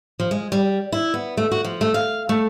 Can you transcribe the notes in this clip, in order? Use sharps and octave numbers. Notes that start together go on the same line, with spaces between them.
F3
G#3
G3
E4
B3
A3
F#4
F3
A3
F5
A3